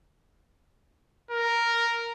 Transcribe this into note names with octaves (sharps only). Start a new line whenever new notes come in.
A#4